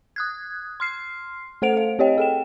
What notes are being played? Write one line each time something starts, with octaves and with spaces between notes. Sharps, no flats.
D#6 F#6 G#6
C6 F6 C7
A3 A4 C5 F#5 D7 F7
F5
C4 G4 C#5 D#5 G5
G#4 A4 G5 E7